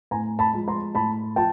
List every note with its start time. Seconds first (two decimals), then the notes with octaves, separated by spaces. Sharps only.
0.11 A2 G#5 A#5
0.39 A5 B5
0.53 F3 G#3
0.68 A#5 C6
0.95 A2 A5 B5
1.36 F3 G5 A5